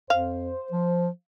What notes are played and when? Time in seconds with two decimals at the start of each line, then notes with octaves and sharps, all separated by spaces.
0.10 F2 C5 F5
0.72 F3